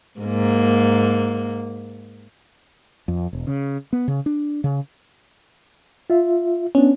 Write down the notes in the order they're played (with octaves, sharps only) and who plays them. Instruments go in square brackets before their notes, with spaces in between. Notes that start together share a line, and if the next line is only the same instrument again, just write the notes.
[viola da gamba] G#2 A#3
[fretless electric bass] F2
E1
C#3
B3
C#3
D4
C#3
[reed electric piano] F4 E5
[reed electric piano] B3 D4 [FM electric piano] C#4